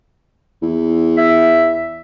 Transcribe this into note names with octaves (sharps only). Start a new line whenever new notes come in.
E2
E5